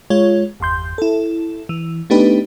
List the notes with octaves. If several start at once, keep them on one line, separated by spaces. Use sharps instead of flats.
G#3 F4 C#5
G1 E2 C6 G6
E4 A4
E3
A3 B3 D4 D#4 G4 B4